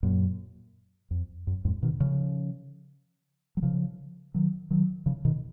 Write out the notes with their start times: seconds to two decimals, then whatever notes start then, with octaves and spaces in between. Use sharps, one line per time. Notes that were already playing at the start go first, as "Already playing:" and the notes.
0.03 F#2 A#2
1.11 F2
1.47 F#2
1.65 F2 G#2
1.83 B2 D#3
2.00 C#3 F3
3.57 F#3
3.63 C#3 F3
4.34 D#3 F#3
4.70 D#3 F#3
5.06 C#3 F3
5.25 B2 D#3